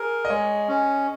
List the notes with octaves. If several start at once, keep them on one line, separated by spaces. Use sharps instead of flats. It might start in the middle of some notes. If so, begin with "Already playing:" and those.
Already playing: G#4 A#4
D#5
G#3 C#5
C#4